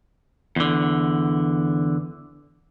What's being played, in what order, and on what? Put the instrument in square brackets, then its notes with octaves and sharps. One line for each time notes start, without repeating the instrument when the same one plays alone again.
[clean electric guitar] E2 D3